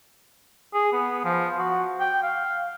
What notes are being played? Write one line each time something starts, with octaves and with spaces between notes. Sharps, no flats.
G#4
B3
F3
F#4
G5
F5